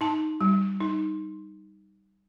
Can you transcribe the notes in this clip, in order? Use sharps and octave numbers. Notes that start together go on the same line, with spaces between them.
D#4 A5
G3
D#4